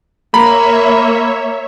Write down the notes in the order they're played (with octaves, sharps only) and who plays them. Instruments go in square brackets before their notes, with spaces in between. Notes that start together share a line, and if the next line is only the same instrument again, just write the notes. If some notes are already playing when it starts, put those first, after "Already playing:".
[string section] A#3 [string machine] C#5 E5 [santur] A#5 [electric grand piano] B5